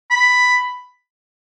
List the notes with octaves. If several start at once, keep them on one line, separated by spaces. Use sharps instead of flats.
B5